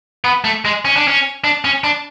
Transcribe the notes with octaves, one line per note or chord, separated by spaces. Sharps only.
B3
A3
G#3
C#4
D4
C#4
D4
C#4
D4